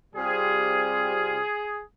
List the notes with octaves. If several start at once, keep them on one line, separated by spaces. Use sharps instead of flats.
C3 G3 C4 F4 G#4